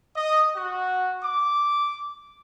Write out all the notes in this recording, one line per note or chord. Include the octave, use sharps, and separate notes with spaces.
D#5
F#4
D6